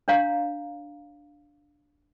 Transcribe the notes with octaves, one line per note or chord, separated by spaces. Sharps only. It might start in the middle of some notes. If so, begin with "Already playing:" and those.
D4 C#5 F5 A#5